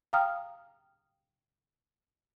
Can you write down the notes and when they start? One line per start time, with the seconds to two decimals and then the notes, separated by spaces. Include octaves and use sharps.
0.13 F5 G5 A#5 D#6 F6